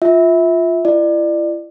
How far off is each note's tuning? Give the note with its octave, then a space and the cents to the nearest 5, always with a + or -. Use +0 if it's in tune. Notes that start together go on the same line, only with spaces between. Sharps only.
F4 +0 E5 -20
E4 +40 D5 +30